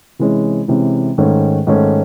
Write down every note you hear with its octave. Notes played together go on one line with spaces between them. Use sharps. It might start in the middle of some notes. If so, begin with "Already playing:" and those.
C3 E3 G#3 C#4
C3 E3 G#3 C#4
G#2 D#3 A3 C#4
G#2 D#3 A3 C#4